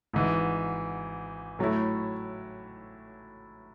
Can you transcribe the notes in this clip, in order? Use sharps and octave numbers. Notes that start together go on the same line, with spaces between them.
G#1 G#2 E3
A2 F#3 A3 E4